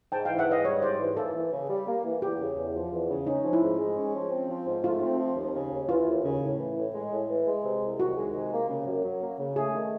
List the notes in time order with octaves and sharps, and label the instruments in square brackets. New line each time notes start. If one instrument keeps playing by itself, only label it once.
[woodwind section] G#2 [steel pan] G5 A5
[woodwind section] E3 [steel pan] F5 G5
[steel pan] E5 F#5
[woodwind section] G#2 [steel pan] D#5 F5
[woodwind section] G3 [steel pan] C#5 D#5
[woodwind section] G#2 [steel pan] C5 D5
[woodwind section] E3
[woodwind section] A#3 [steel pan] A4
[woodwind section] E3
C#3
G3
A#3
E3
[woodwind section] E2 [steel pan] G4
[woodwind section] C#3
E2
F3
E2
C#3
[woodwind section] C#4 [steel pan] D#4
[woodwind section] F3
[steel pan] E4
[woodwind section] G#2
G#3
C#4
F3
C4
F3
G#2
[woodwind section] A3 [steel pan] F4
[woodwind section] C4
F3
D#2
C#3
D#2
[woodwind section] E3 [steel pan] F4
[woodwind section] D#2
C#3
A2
E3
A2
G#3
A2
E3
G#3
C3
C2
[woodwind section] D#3 [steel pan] F#4
[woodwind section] G#3
C3
A#3
C#3
F#2
F#3
A#3
C#3
[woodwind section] A3 [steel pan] G#4
[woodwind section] D#3